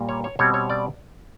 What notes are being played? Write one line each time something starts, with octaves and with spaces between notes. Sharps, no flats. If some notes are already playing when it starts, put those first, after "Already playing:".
Already playing: A#2 G3 A#3
C#5
C#5
B2 G3 C4 C#5
C#5
D5